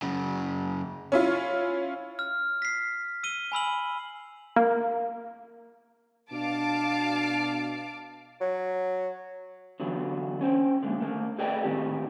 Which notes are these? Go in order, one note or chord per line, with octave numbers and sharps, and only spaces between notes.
F#2 C#3
C#4 E4 F4
F6
B6 C7
E6 D#7 G7
G#5 B5 E6 F#7
A#3
B2 D4 F5 A5 D6
F#3
D3 E3 F#3 B3
C#4 C5 G5
D3 G#3 A#3
D#3 A3 A#4
G#4 A4 B4 D5 D#5 G5
A2 D#3 C4 D#4 G4